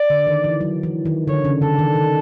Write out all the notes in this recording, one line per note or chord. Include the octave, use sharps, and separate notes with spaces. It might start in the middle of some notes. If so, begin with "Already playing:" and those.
Already playing: D5
D3
D#3
E3
F#3
E3
D#3
D3 C#5
C#3
D3 A4
D#3
D#3